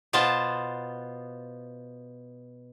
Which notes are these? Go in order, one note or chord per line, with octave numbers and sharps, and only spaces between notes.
B2 B3 F4 C5 A5